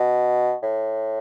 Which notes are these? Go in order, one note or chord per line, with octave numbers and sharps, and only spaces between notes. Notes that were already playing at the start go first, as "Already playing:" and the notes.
Already playing: B2
A2